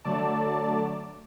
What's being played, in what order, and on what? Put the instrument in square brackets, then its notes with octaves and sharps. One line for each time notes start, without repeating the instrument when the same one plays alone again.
[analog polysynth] D3 F#3 A3 D5 A5